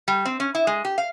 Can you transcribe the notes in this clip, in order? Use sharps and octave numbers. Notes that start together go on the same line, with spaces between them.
G3
C4
C#4
E4
G#3
G4
F5